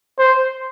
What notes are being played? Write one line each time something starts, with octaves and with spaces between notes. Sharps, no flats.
C5